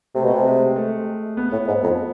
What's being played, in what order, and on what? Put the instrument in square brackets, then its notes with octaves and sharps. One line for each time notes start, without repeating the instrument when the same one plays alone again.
[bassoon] C3 [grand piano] A3
[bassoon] B2
C3
[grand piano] G#3
A3
B3
[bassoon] A2
G#2
F2